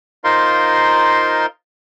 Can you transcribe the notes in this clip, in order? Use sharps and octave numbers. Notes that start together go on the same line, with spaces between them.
D#4 F4 A#4 C5 F5 C6